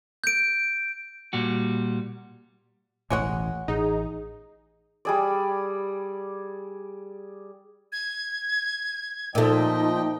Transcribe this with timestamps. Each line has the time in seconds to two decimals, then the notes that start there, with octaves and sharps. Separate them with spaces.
0.24 G6 D7
1.33 A#2 G3 F#4
3.10 E1 A1 A2 G#3 C#5 F#5
3.68 A1 D#4 G#4
5.05 G3 G#4 D5
7.92 G#6
9.35 A#2 F3 A3 D#4 D#5 G5